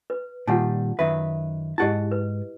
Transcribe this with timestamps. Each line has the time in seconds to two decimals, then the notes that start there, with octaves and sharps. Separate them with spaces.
0.10 B4
0.47 A#2 D#3 G3 F4 F#5 A5
0.99 F#2 D#3 B4 E5
1.78 G#2 E4 G4 D#5 F#5 A5
2.12 B4